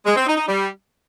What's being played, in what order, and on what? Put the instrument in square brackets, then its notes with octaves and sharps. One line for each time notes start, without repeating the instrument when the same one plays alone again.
[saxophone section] G#3
C4
D#4
D#4
G3